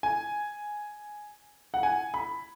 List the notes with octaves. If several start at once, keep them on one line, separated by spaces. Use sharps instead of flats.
G#5
F#5
G#5
B5